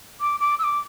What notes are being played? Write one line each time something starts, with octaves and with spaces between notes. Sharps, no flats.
D6
D6
E6
D6